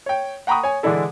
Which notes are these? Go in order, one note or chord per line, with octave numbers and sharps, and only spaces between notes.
C#5 G5
F#5 G5 A#5 B5 C#6 D#6
C#5 G#5
D3 E3 G#3 D4 E4 A4